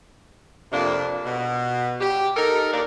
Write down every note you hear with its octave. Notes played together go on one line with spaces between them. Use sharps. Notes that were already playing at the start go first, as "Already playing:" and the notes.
F2 C3 A#3 D4
B2
G4
D#4 A4 A#4
D#2 A#3 D4 A#4 D5